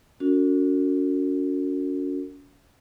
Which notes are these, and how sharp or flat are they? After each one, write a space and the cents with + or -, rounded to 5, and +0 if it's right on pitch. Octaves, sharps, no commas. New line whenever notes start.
C#4 +40 F#4 -30 A#4 -45